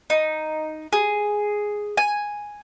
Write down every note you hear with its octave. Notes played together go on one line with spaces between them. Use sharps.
D#4
G#4
G#5